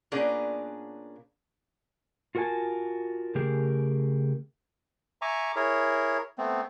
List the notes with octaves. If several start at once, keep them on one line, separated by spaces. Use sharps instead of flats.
A#2 B3 C#4 D4 G#4 A#4
F4 F#4 A#4 E5 G#5 A5
C#3 A3 G4 G#4 A#4
E5 G#5 A#5 C#6 D6
E4 G#4 A#4 C#5
A3 B3 C4